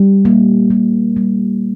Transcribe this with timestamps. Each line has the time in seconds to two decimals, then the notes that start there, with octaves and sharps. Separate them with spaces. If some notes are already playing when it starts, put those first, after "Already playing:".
Already playing: G3
0.25 A#3
0.70 G3
1.17 G3